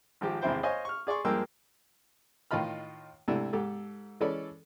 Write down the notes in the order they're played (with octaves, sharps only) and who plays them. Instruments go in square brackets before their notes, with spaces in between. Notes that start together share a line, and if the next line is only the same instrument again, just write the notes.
[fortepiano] G#1 F3 G4
G#1 E2 C3 E4 C5 G5
C5 C#5 D#5 F5 G#5
C#6 F6
G#4 D5 C6 C#6
G2 F3 G#3 A#3 G5 E6
A2 D#3 F4 D#5 B5 F6
G#2 C3 A3 D4 E4
G#2 G4 A4
E3 G#3 C#4 A4 D5 B5